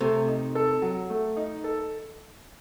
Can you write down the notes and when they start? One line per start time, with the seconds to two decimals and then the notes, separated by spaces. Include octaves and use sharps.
0.01 C3 A3
0.28 D#4
0.55 A4
0.82 F#3
1.10 A3
1.37 D#4
1.64 A4